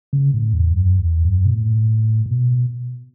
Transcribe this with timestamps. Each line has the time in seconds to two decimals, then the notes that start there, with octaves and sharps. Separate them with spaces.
0.13 C#3
0.34 A2
0.53 E2
0.72 F#2
0.99 E2
1.25 F#2
1.45 B2
1.52 A2
2.26 A2
2.30 B2